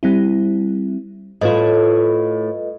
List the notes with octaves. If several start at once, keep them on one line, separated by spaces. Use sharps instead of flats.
G3 C4 E4
A2 F4 B4 D#5